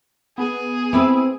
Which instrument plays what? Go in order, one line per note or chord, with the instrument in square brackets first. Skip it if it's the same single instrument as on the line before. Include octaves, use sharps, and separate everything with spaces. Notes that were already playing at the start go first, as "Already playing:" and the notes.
[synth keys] B3 [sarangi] G#4
[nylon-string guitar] C4 [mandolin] E4 B4 E6